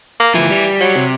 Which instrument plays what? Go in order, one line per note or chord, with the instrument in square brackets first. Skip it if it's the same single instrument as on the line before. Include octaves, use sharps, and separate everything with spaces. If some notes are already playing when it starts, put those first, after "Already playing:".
[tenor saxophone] A#3
[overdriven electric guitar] D2 F3 [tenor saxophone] E3
[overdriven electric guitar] G3
[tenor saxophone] F#3
[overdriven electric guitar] C3